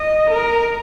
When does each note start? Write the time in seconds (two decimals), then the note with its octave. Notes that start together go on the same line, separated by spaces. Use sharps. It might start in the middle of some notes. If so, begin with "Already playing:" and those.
Already playing: D#5
0.30 A#4